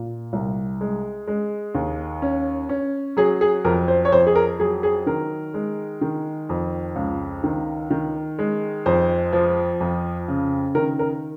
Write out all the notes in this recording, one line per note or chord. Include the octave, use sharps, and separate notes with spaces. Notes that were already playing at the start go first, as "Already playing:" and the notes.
Already playing: A#2
C2
G#3
G#3
D#2
C#4
C#4
F#3 G#4
G#4
F2 A#4
C5
C#5
F2 C5
G#4
A#4
F#3 G#4
G#4
D#3 A#4
G#3
D#3
F2
C#2
D#3
D#3
G#3
F2 C5
F3
F2
C#3
D#3 A#4
A#4